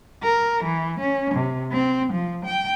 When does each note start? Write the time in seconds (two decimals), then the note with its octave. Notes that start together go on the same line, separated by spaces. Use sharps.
0.23 A#4
0.64 E3
0.99 C#4
1.34 C3
1.72 C4
2.13 F3
2.45 G5